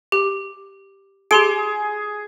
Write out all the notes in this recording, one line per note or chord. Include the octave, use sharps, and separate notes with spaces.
G4
G4 G#4 C6 D7